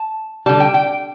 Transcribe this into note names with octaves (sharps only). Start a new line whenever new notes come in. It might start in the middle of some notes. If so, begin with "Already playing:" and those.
Already playing: A5
D3 G3 A5
G5
G5